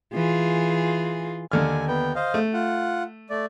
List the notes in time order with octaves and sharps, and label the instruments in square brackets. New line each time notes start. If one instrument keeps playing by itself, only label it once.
[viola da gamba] E3 F4 G#4
[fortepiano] D#2 D3 F6 [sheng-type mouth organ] G#5
[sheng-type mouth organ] B3 G5
C5 D#5 F5
[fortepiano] A3
[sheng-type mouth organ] F4 F#5
A3 D5